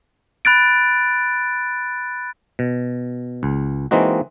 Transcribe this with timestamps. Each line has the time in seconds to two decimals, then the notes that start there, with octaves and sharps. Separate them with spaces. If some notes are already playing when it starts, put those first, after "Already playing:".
0.45 B5 F#6 A6 D7
2.59 B2
3.43 C#2
3.91 E3 G#3 A#3 C4 D#4 F#4